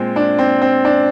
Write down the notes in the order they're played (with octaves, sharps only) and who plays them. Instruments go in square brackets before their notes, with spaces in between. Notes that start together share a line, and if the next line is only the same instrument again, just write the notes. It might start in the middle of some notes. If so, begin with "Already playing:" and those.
Already playing: [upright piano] A#2 G#3 C4
D4
C4
C4
D4